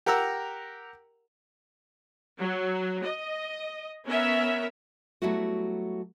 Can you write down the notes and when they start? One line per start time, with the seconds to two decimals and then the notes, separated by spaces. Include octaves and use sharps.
0.06 G4 A#4 F#5 A#5 E6
2.39 F#3
3.03 D#5
4.06 B3 C#4 A#4 E5
5.22 F#3 G3 A3 B3 E4 F#4